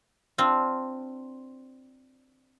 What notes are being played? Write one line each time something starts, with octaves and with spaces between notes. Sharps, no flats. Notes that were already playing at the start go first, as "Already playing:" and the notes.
C4 D4 F4